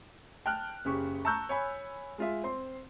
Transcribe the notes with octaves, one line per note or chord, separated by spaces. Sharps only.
G5 A5 F6 F#6
F#1 C#3 G4 C#6
A5 A#5 C#6 E6 F#6 G6
C#5 G#5 B5
G#3 F4 E5
C4 C6